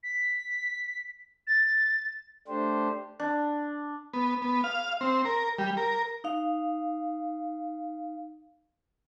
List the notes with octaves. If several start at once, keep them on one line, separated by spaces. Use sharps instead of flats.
B6
A6
A3 D4 G4 C5
D4
B3
B3
F5
C4
A#4
G3
A#4
D#4 F5